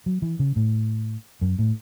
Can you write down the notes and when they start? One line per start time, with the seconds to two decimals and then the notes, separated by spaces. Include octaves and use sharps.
0.06 F#3
0.22 E3
0.39 C#3
0.56 A2
1.41 F#2
1.59 A2